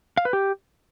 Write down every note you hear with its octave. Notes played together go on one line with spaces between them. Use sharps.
F5
B4
G4